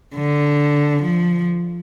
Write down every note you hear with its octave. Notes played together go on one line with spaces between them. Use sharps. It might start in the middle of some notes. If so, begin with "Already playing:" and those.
D3
F3